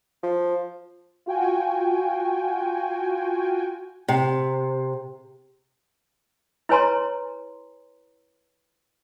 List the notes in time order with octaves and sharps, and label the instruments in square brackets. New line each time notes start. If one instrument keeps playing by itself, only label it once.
[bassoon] F3
[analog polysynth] F4 F#4 G5 G#5
[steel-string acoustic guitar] C3
[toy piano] E4 B4 C#5 G#5 A#5 C6